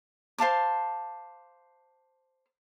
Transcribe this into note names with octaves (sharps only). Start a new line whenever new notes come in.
C5 F5 A5 D6